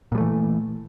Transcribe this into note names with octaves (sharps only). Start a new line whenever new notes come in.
A#2 E3 G3 A3